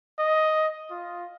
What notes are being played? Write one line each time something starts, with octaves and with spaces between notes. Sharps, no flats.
D#5
F4